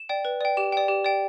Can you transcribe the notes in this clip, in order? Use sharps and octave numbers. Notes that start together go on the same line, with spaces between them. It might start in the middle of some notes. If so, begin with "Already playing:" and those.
Already playing: E7
D5 G5
B4
D5 G5
G4 E7
D5 G5
G4
D5 G5